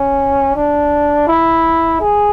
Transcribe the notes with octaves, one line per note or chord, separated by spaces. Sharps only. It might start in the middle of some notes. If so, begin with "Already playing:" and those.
Already playing: C#4
D4
E4
G#4